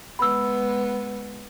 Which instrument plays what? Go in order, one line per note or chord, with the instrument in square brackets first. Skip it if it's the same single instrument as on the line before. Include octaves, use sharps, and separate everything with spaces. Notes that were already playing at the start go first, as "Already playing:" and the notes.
[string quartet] G#3 B3 [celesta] B5 E6